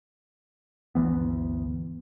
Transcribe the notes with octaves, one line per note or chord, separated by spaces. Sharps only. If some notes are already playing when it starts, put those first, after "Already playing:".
G1 D2 E3 B3